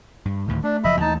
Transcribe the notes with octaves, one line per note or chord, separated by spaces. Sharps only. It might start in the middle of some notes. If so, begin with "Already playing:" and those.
G2
D2 A2 D#3
A3 D4
F#1 F3 F#3 D#5 E5 B5
D#2 E3 A3 D#4 A5